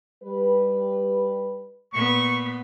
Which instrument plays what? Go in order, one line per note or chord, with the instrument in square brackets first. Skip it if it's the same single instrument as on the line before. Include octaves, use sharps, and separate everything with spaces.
[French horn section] G3 B4
[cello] A#2 B3 [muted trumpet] C#6